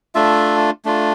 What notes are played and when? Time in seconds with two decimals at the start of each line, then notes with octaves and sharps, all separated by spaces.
0.15 A3 D4 F4 E5
0.85 A3 D4 F4